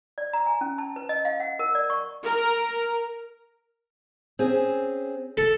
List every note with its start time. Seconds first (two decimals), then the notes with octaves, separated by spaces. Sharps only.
0.18 D5
0.33 A#5
0.47 G#5
0.61 C#4
0.78 A5
0.96 B4
1.09 D#5
1.25 F5
1.40 F#5
1.59 A#4
1.75 D5
1.90 C#6
2.24 A#4
4.39 C4 C#4 G#4
5.37 A4